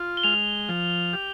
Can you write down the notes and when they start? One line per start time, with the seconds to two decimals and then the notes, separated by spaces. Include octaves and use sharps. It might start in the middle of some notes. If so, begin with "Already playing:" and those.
Already playing: F4
0.17 G7
0.23 G#3 F7
0.69 F3
1.13 G4